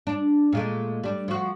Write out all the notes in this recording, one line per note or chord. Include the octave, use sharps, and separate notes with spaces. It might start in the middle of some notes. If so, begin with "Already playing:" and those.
D4
A#2 G#3 A3
G3 D4
F3 F#4